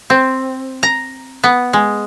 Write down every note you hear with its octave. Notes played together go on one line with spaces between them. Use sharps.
C4
A#5
B3
G#3